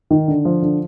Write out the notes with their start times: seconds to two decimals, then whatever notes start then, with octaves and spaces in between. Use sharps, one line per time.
0.11 D#3
0.28 D3
0.45 F3
0.62 D3